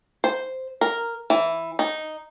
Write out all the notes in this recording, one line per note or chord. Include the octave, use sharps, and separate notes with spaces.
C5
A#4
E3
D#4